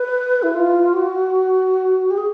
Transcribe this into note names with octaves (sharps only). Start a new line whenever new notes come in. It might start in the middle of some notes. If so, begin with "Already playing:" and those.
Already playing: B4
E4
F4
F#4
G4
G#4